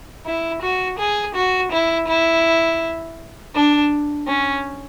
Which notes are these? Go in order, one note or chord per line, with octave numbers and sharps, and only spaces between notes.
E4
F#4
G#4
F#4
E4
E4
D4
C#4